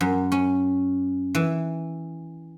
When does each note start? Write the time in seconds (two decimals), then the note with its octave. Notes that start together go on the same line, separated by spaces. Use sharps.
0.01 F#2
0.32 C#4
1.35 E3